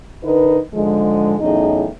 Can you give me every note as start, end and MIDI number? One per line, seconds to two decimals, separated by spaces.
0.24 0.57 50
0.24 0.57 63
0.24 0.57 70
0.24 0.57 71
0.74 1.35 44
0.74 1.35 50
0.74 1.35 53
0.74 1.35 56
1.40 1.88 40
1.40 1.88 45
1.40 1.88 54
1.40 1.88 61
1.40 1.88 63
1.40 1.88 68